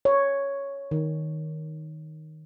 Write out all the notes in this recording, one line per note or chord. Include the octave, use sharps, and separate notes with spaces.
C#5
D#3